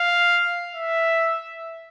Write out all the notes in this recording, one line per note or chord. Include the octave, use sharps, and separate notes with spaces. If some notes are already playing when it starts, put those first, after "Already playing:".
Already playing: F5
E5